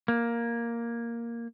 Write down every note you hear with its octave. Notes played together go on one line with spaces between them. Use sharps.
A#3